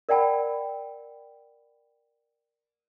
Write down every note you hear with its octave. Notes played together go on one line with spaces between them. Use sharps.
A#4 D5 F#5 G5 A5 B5